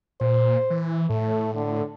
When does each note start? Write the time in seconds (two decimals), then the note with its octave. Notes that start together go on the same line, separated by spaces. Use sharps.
0.21 A#2 C5
0.70 E3
1.10 A2 A3
1.55 D3